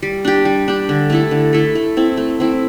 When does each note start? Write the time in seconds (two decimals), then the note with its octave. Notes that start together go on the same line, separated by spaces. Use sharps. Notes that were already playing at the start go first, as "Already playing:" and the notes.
0.02 G3
0.25 D4 G4
0.45 G3
0.68 D4 G4
0.89 D3
1.10 A3 E4 A4
1.31 D3
1.53 A3 E4 A4
1.75 A3
1.97 C4 E4
2.17 A3
2.40 C4 E4